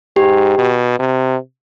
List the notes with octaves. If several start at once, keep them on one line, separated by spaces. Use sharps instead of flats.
G#2 G4
B2
C3